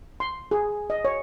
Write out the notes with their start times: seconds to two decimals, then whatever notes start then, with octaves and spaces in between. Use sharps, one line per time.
0.20 C6
0.51 G#4
0.90 D#5
1.05 C#5